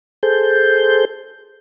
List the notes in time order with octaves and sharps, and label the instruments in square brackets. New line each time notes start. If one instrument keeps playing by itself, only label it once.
[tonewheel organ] G#4 A4 C5 G6